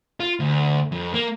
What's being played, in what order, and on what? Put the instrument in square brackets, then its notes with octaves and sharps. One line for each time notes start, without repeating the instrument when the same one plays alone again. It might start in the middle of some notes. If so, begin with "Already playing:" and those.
[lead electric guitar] F4
D2
F2
A#3